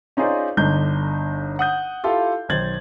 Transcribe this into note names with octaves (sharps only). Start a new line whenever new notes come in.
C#4 D#4 F4 G#4 C5 D5
G1 D3 D4 D#4 G6
F#5 D#6 G6
E4 F4 G4 A4 F5
B1 D#3 C5 G#6 A6 F#7